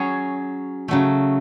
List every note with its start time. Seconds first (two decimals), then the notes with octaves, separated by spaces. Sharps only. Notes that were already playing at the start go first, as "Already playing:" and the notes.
Already playing: F#3 C#4 G#4 C#5
0.88 C#3 F#3 A3